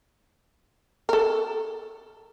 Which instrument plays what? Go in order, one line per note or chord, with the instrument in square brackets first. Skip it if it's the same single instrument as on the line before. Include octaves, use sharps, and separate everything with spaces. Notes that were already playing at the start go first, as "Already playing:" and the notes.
[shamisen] A4 A#4